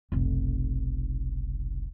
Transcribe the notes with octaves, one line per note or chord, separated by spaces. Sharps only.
F1 B1